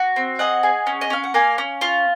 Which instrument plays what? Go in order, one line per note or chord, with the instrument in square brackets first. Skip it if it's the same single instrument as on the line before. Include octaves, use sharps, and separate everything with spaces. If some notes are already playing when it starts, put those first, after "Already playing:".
Already playing: [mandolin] F#4
C4
G#4 D#5 F#5
G#4
C#4
D#5
C#4 F5
F#5
A#3 F5 G#5
C#4
F4